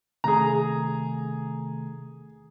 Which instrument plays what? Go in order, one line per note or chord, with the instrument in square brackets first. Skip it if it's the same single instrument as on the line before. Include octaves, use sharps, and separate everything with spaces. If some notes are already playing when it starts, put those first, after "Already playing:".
[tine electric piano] C3 D#3 A3 [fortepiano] G#4 A#5